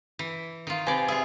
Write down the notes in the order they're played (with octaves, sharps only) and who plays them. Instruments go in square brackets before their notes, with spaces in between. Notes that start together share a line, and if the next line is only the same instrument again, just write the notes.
[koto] E3
D#3 F4
[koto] C3 D5 [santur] B4 G#5
[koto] F4 G#4 [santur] E5